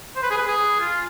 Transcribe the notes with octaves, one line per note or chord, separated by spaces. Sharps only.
C5
B4
G#4
B4
G#4
F4